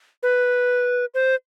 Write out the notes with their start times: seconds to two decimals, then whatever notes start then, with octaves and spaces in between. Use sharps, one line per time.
0.23 B4
1.14 C5